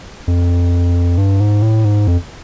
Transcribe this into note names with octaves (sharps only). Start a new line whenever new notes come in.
F2
G2
G#2
A2
G#2
F2